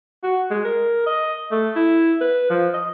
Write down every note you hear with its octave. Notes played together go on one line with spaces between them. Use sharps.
F#4
G#3
A#4
D#5
A3
E4
B4
F3
D#5